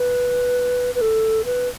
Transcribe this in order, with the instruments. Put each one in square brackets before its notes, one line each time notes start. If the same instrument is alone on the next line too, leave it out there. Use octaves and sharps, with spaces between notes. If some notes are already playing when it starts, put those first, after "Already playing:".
Already playing: [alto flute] B4
B4
A4
B4